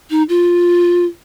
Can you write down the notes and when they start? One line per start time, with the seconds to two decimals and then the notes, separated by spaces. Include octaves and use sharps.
0.10 D#4
0.29 F4